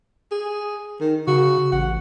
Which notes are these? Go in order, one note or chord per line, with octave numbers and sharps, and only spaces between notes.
G#4
D#3
C#3 F#4
A1 F#5